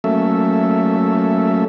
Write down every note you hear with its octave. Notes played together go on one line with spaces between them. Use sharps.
F#3 A3 A#3 C#4 A4 E5